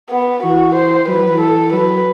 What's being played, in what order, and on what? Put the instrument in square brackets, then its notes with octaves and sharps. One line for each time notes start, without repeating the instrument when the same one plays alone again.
[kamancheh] B3
[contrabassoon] E3 [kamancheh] F#4
[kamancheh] C5
[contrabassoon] F#3 [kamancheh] B4
[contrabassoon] F#3
E3
[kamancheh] A4
[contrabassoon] F#3 [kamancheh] B4